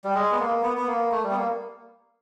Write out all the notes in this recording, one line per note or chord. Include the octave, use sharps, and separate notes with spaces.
G3
G#3
B3
A#3
B3
B3
A#3
A3
G3
B3
A#3